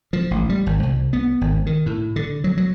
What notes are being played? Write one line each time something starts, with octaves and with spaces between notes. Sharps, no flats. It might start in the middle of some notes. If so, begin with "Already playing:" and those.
F3
A1
G3
G#1
C2
B3
G#1
D#3
A2
D3
F#3
F#3